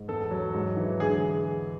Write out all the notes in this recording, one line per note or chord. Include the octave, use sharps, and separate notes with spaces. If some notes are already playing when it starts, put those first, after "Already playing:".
Already playing: G#2
E2 A4
F#3
G#2
E3
D3 G#4